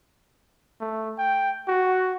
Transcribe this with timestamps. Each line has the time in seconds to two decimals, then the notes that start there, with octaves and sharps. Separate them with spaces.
0.81 A3
1.18 G5
1.68 F#4